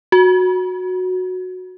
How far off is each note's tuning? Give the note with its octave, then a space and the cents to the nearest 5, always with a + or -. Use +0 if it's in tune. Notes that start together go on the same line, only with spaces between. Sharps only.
F#4 -10